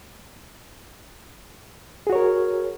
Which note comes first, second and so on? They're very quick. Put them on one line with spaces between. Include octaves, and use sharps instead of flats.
G#4 F#4 C#5 A#4